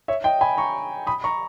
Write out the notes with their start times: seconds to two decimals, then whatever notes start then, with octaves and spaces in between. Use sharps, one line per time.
0.08 C#5 E5
0.24 D#5 G5
0.41 G#5 B5
0.57 A#5 C#6
1.07 B5 D#6
1.24 A#5 C#6